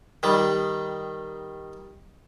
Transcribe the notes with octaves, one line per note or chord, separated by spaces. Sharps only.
D#3 G3